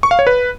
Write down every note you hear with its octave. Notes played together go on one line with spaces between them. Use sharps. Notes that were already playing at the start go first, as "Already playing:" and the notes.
C#6
F5
C#5
B4